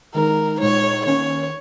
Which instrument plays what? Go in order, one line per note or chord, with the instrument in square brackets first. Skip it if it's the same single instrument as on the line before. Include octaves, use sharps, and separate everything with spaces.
[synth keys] D#3 G#3 D#4 [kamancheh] A#4
[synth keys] A#2 G#3 D#4 [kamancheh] C#5
[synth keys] D#3 A#3 C#4 [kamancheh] C#5